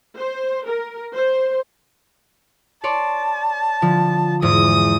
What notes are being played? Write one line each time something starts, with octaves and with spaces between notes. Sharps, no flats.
C5
A#4
C5
C#5 D5 A5 C6
D3 F3
E2 G#2 D#6